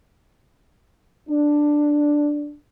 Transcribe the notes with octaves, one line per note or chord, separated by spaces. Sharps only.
D4